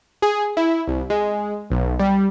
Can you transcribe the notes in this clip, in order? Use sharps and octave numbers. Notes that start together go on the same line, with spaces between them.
G#4
E4
C2
G#3
B1
G3